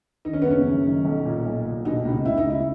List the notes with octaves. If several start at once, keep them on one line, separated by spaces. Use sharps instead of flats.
D#3 D#4
C#4
F#1 B3
C#4
F#2
D#3
B1
A#2
B1
A#2
B2 D#4
C#2
C#2 E4
D#4
C#2 E4